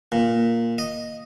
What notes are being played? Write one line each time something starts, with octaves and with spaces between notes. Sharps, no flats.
A#2
D#5